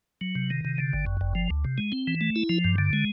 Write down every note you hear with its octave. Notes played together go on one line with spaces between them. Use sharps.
F#3
C3
D#3
C3
D3
G1
F#2
G1
F3
D2
C3
G#3
C4
E3
A3
E4
F3
G2
D3
G#3